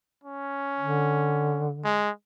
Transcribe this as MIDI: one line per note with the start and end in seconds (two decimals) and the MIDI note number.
0.24 1.70 61
0.80 2.06 50
1.84 2.10 56